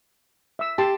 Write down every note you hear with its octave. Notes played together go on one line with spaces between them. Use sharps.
E5 E6
G4 A5 C6